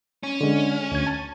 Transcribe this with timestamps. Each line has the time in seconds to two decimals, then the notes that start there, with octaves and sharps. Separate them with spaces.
0.23 C#4
0.41 D3 G#3
0.92 D2 G#6
1.07 A5